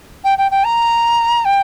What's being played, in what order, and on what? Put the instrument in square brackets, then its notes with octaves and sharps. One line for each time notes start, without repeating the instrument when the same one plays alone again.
[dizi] G5
G5
G5
A#5
G5